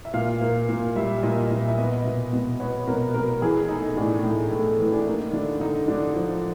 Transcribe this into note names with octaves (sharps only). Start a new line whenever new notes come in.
E5
A#2 F5
A#3
A#2
G3 E5
A#2 D#5
A#2 E5
E5
B3 D#5
B2
B2
B3 C#5
B2 A#4
B2 A#4
E3 G#4
A3 D#4
A2 D4
A2
A3
E3
D4
A#3 D#4
D3 D4
D3 D#4
D3 D4
F3